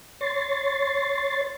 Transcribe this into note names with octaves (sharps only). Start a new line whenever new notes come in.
C#5 C6 A6